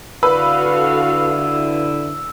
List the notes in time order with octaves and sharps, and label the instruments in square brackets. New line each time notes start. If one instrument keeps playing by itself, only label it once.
[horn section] D3 E4 [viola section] F#4 A4 F5 [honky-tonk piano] B4 [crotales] E6